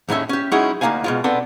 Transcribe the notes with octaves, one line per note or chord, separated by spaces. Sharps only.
D#2 A2 G#3 C#4 E5
C#4 G4
F#3 G#3 C#4 D#4 E4 G#4
D2 A#3 D4 D#4 F5 G#5
B2 G#3 F4
B3 C4 D4 A4